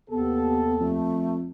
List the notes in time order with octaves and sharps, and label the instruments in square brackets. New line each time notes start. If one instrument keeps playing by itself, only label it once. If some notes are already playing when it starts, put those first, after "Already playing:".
[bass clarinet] D#2 [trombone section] C3 G4 A4 [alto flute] B3
[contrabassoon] F2 [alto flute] A3